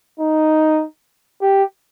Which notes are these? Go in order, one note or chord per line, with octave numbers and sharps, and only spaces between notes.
D#4
G4